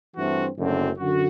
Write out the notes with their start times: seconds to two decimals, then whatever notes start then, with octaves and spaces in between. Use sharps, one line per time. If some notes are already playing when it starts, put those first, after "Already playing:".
0.15 G2 E3 A3 C4 F#4
0.57 F#1 F#2 D3 A3 C4
0.98 F#2 D3 F#4